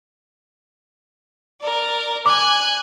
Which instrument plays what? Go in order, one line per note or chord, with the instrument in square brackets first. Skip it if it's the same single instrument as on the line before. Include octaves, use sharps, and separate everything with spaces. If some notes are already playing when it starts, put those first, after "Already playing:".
[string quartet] A#4 D5
[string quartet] G#5 F#6 [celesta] D6